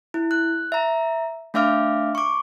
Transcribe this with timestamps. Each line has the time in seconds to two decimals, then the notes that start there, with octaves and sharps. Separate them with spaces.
0.14 E4
0.31 F#6
0.72 E5 A#5
1.54 A3 D4 E5 F5 D6 F6
2.15 C#6 D6